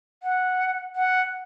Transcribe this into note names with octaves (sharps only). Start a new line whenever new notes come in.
F#5
F#5